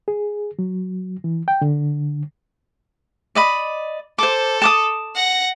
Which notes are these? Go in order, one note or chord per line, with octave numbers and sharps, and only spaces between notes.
G#4
F#3
E3
G5
D3
D5 D#5 B5
A4 C5 D6
A5 D6 D#6
F#5 A#6